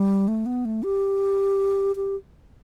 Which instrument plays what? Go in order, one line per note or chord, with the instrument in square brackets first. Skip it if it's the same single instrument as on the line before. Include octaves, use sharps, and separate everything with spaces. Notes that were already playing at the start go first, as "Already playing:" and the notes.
Already playing: [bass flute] G3
A3
B3
A3
G4
G4